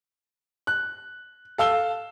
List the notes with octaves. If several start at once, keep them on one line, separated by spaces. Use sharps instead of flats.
F#6
A4 F5 E6 G7